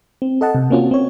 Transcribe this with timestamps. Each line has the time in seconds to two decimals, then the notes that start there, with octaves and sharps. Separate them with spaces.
0.22 C4
0.41 A4 D#5 F#5 A5
0.55 C3
0.70 A#3 C4 C#4 F4 F#4
0.91 C4 C#5